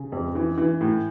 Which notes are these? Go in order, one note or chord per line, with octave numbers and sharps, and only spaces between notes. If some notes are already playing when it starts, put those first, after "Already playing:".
Already playing: C#3
F2
E3
E3
A2